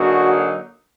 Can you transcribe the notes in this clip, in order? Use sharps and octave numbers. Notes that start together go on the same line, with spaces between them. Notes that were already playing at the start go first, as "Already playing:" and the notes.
Already playing: D3 F#3 A#3 D#4 F#4 G#4